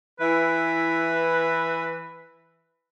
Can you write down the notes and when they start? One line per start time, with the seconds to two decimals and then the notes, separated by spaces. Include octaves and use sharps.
0.20 E3 E4 B4